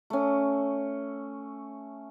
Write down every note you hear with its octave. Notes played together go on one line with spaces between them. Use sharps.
A3 C#4